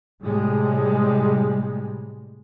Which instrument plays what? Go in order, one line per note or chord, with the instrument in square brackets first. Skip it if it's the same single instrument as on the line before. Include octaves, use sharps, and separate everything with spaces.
[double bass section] A2 C3 G3 G#3